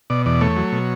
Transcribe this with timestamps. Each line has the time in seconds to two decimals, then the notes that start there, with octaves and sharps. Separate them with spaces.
0.10 B2 D5
0.26 E2 D5
0.41 A3 C#5
0.57 F#3
0.72 B2